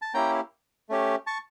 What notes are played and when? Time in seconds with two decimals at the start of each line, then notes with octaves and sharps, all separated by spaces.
0.02 A5
0.14 A#3 C#4 E4 G4 G5 A#5
0.89 A3 C#4 G4
1.27 A5 C#6